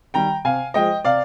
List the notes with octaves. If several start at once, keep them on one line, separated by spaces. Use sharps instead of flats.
D#3 G3 G5 A#5
C3 F5 G#5
F3 G#3 D#5 G5
C3 D5 F5